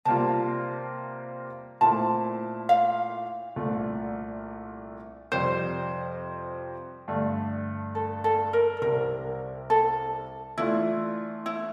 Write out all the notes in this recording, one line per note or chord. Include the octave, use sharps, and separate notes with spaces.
C3 G3 A#3 F4 A5
A#2 A3 C4 E4 A5
F5
C2 A#2 A3 D4
F2 C3 G3 C5
G2 D3 A3
A4
A4
A#4
A4
C2 C3 G3 A#4
A4
E3 A3 D4 E4 F4
E4